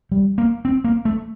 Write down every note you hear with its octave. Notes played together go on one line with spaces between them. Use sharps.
G3
A#3
C4
A#3
A3